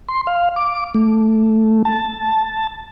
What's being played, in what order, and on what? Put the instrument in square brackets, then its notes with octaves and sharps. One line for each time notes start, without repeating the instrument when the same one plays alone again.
[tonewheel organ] C6
F5
D6
A3
A5